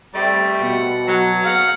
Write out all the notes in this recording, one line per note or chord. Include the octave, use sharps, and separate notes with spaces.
G3 A3 C4 D5
B2 F#5
F#3
F5 F#5